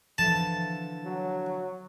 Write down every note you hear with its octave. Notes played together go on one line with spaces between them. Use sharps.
D3 E3 F3 A5
F#3